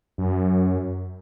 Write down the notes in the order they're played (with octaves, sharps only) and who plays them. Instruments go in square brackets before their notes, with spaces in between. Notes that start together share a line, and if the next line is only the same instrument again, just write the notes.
[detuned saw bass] F#2